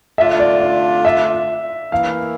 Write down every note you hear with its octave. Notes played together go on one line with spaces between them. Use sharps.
D3 A3 D4 F4 E5
D5
D5
E5
E3 A#3 E4 F5